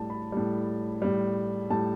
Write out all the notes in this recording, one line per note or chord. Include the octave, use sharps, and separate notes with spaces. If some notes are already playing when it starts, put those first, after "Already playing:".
Already playing: A2 G3 A5
B5
A2 G3
A2 G3
A2 G3 A5